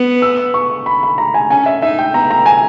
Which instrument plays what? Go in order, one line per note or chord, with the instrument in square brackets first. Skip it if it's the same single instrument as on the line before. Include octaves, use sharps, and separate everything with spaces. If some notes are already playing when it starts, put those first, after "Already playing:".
Already playing: [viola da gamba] B3
[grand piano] E6
C#6
B5
B5
A#5
G#5
[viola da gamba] C#4 [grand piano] G#5
[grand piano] E5
[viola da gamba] D#4 [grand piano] E5
[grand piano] G5
[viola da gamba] B3 [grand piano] A#5
[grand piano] A#5
G#5